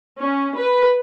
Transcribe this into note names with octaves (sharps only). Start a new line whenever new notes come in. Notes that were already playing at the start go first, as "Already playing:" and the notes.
C#4
B4